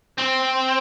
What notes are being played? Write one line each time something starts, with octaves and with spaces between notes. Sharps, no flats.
C4